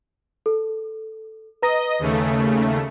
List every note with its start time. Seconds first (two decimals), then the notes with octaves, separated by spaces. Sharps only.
0.46 A4
1.62 B4 D#5 A#5 A#6
1.99 D#2 C#3 A3